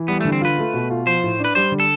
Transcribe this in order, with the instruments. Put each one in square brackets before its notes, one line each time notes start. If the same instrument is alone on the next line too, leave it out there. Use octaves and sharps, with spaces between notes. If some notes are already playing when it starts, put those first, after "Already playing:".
Already playing: [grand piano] E3
[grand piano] G3 [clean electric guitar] B3
[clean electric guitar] A3
[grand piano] D3
[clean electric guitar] C4
[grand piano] F4 [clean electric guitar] B4
[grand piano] A3
B2
F4
[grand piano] F3 [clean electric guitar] C5
[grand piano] A2
D4
[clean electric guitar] B4
[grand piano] G3 [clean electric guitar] C5
[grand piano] D3
[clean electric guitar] A4